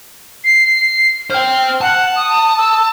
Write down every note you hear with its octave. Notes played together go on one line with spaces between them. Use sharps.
C7
C5 G5 F6
F#5 A5
D#6
E6